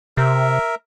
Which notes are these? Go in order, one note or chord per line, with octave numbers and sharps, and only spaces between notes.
C3 A#4 E5